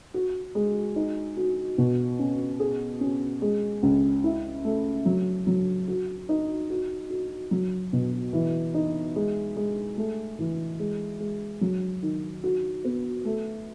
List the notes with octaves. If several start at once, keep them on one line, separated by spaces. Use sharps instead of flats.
F#4
G#3
D#4
F#4
B2
C#4
G#4
C#4
G#3
C#2
E4
A3
F#3
F#3
F#4
D#4
F#4
F#4
F#3
B2
E3
D#4
G#3
G#3
A3
E3
G#3
G#3
F#3
D#3
F#4
B3
A3